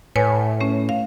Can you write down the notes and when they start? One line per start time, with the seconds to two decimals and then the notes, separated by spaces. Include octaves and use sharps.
0.16 A2 B4 C#5 G#5
0.60 A3 C#4
0.89 F5